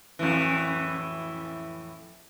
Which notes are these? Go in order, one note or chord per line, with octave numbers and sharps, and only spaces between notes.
F2 A2 E3